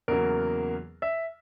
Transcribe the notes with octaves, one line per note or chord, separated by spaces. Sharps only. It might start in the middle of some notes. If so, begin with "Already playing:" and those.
E2 C#3 F#3 A#3 A#4
E5